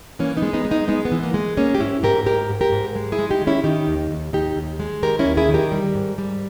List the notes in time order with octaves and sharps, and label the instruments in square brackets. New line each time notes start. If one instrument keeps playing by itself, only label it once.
[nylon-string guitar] E3 A#3 C#4
B3 D#4
G#3
B3 D#4
G#3
B3 D#4
G#3 B3 D#4
B3
E3
A#3
G#3
G#3 A#3 C#4
G4
G#2 C#4 E4
G#2 G4 A#4
G#2 G4 A#4
G#2
G4 A#4
G#2
G#3
E4 G#4
G#3
D#4 G4
D#3
C#4 E4
D#3 D#4 G4
D#2
D#2
D#2 D#4 G4
D#2
G#3
D#3 G4 A#4
C#4 E4
D#2
E4 G#4
D#3
G4 A#4
G3
G#2
G3